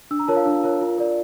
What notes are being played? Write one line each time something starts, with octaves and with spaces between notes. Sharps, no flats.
D4 E6
A#5
F4 A#4 C#5 A5
F5
D4
F4 A#4 C#5
F4
A#4 D5